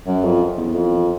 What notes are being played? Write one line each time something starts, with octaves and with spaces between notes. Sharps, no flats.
F#2
F2
E2
F2